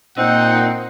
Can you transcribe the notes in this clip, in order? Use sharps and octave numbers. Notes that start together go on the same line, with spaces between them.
A#2 C4 D#4 F#5